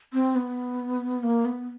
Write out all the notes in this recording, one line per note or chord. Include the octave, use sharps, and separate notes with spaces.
C4
B3
A#3
B3